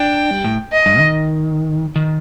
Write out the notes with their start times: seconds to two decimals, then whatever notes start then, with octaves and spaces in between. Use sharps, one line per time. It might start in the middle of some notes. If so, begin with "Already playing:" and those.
Already playing: D4 G5
0.31 G3
0.44 A2
0.72 D#5
0.86 G2
0.99 D#3
1.96 D#3